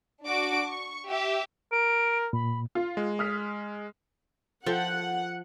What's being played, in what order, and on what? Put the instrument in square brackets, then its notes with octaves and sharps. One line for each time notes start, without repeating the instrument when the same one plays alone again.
[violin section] D4 F#4 D6 D7
C#6
G4 E5
[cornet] A#4 [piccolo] D7
[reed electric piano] A#2 [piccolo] B5
[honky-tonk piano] F4
[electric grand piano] G#3
[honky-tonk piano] D#6 F6 B6
[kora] F3 A4 G5 [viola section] F#5